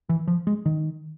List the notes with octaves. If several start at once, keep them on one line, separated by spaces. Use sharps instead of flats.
E3
F3
G#3
D#3